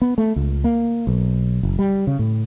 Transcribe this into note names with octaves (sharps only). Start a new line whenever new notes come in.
B3
A3
C#2
A#3
B1
F#1
G3
C#3
A2